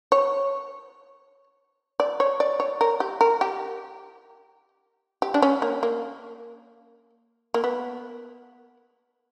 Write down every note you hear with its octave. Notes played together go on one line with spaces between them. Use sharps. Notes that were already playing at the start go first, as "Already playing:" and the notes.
C#5
D5
C#5
D5
C#5
A#4
G4
A#4
G4
G4
D4
C#4
A#3
A#3
A#3
B3